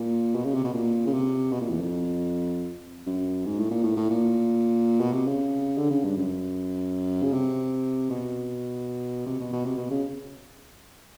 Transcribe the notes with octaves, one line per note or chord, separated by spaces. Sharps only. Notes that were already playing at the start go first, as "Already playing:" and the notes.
Already playing: A#2
B2
C#3
C3
B2
A#2
C#3
C3
B2
A#2
E2
F2
F#2
G#2
A2
A#2
A2
A2
A#2
B2
C3
C#3
D3
C#3
G2
F#2
C#3
C3
B2
C3
B2
B2
C3
B2
C#3